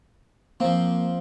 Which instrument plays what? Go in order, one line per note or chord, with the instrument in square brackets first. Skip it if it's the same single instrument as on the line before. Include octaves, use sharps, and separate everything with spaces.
[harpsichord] F3 C4 [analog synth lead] A#3